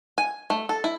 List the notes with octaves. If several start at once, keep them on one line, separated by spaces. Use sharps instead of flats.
G#5
A3
A4
E4